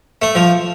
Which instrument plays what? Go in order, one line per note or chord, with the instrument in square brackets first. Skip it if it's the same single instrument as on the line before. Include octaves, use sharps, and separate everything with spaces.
[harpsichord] A3
F3